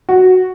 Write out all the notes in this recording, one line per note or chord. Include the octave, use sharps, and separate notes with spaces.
F#4